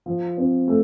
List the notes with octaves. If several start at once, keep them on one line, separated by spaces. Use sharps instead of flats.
F3
C4
A3